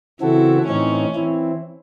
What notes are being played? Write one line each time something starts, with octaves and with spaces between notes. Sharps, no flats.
C#3 E3 C4 E4 F#4 A4
A2 E3 C4 C#4 D#4
E3 C4 E4